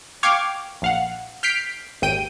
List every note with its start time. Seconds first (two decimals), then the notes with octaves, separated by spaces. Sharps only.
0.23 F5 G5 C#6 D6 F6 G#6
0.82 A#1 F5 F#5
1.43 F6 G6 B6 C7 D7
2.02 G#1 D#2 G5 D#7